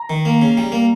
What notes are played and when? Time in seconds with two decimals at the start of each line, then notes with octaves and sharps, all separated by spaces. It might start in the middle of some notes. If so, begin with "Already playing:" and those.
Already playing: A#5
0.10 D#3
0.25 A#3
0.42 C#3
0.57 G3
0.72 A#3